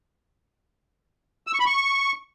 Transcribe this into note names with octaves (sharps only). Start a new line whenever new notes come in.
E6
C#6
B5
C#6